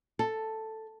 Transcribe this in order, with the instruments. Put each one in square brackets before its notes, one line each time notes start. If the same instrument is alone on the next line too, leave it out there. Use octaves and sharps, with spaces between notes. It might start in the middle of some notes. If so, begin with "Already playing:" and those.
[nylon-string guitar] A4